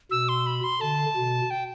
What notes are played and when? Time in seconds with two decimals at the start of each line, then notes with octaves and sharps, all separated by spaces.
0.11 B2 E6
0.29 C6
0.47 B5
0.64 C6
0.81 D3 A5
1.16 B2
1.50 G5